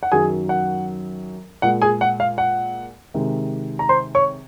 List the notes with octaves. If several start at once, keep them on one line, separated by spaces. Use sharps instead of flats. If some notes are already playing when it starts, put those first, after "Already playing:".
F#5
F#2 D#3 F#3 G#4 G#5
F#5
A#2 G#3 F#5
G#4 G#5
F#5
F5
F#5
C3 D#3 G#3
A#5
C5 C6
C#5 C#6